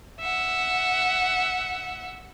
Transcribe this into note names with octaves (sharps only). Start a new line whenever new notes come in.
E5 F#5